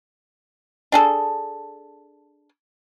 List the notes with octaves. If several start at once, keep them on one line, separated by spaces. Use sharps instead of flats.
D4 G#4 A4